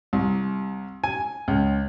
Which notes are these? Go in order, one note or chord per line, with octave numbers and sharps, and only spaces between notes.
C2
G#5
C#2